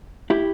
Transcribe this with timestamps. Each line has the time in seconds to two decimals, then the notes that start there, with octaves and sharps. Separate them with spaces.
0.30 E4 G4